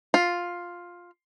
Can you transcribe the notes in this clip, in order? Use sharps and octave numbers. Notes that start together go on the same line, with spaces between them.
F4